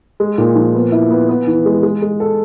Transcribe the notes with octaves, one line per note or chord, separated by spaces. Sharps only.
G#3
A#2
F3
B3
E4
B3
B3
E3
G#3
G#3
G#3
A4